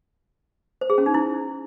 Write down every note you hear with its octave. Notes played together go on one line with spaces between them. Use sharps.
C5
G#4
C#4
D#4
E4